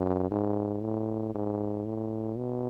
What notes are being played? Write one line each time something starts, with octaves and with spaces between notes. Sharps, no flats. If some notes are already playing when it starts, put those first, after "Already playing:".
Already playing: F#2
G#2
A2
G#2
A2
B2